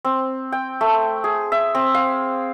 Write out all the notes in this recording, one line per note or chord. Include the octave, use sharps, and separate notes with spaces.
C4
G5
A3
G#4
E5
C4
F5